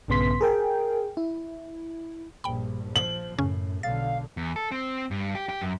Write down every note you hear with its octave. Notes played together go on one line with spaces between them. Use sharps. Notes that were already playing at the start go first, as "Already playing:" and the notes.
A#1 G2 C#3 B3 C6 B6
G#4 A#4 G5
E4
A#1 G2 G5 B5
F3 F#7
F#2 A2 C#3 C#4
B1 D3 F5 A6
E2
A4
C4
G2
G4
G4
F#2